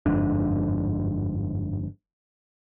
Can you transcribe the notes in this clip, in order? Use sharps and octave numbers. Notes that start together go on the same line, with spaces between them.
G1 F2 G#2 D4